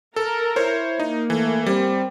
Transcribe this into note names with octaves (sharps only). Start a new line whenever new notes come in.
A4 A#4
E4 C5 C#5
A#3 D#4
E3 A3
G3 C4